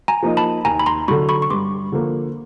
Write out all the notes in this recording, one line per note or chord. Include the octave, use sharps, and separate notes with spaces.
G#5 A#5
F3 A#3 D#4
A5 B5
D#2 G#5 A#5
B5
A#5 C6
D3 F#3 B5 C#6
B5 C#6
C#6
G2 C6 D6
D3 F3 A#3